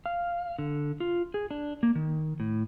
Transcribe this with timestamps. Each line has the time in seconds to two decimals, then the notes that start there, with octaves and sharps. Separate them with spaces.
0.06 F5
0.59 D3
1.00 F4
1.34 G#4
1.51 D4
1.83 A#3
1.95 D#3
2.40 A2